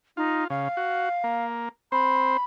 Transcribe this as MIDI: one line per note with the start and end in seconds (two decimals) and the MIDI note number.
0.17 0.44 63
0.17 0.47 65
0.50 0.68 49
0.50 1.46 77
0.77 1.09 66
1.24 1.69 58
1.92 2.37 60
1.92 2.37 72
1.92 2.45 83